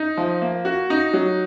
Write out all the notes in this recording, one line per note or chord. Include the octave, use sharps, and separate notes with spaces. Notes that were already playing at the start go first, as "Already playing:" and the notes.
Already playing: D#4
F3
A#3
F#4
D#4
F#3